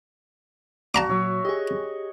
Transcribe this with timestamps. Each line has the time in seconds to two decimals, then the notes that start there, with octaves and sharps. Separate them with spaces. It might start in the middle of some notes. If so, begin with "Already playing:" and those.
0.95 F#4 D5 F5 A5 A#5 D6
1.09 A#2 F#3 C#5 E5
1.45 G4 G#4 D#5